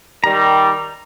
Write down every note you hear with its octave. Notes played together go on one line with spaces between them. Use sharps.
D#3 G3 A#5